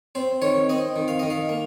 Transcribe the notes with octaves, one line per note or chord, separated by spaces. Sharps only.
C4 C5
D#3 C#5
C4 D#5
D#3
F5
D#3 D#5
F5
A#3